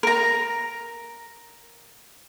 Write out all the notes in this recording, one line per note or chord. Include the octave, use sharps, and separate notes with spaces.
A#4 A#5